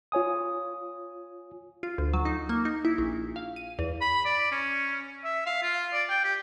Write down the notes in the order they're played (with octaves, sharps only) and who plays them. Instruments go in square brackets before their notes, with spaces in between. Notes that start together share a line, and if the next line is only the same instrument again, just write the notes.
[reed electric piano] F4 C#5 G#5 D#6
[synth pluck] F4
D2
F#3
D#4
A#3
D#4
E4
A#1
F5
D#7
E2
[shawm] B5
D5
C#4
E5
F5
F4
D5
G5
G4